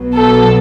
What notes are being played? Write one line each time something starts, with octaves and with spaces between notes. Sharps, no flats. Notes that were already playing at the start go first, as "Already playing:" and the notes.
Already playing: B1 B2 F#3
A4